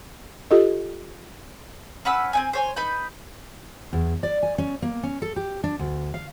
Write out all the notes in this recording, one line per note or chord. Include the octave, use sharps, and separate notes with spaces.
F4 G4 A4 D#5
C#4 B4 F#5 E6
C4 D#4 G#5
C5 C#5 G#5
D#4 B4 B5 G6
E2
D5
G#5
C#4
A#3
C#4
A4
G4
D4
D2
F5